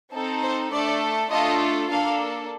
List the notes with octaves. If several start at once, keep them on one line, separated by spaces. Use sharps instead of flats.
C4 D#4 A4
C5
A3 D4 A4 D5
A3 D4 F4 A4 D#5
A#3 D4 A4 F5